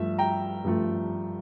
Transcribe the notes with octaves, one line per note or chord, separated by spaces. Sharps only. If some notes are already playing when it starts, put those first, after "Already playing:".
Already playing: G2 F3 A3 E5
G5 A#5
G2 F3 A3